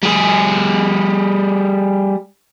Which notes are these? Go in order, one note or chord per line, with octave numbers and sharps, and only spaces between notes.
G3 G#4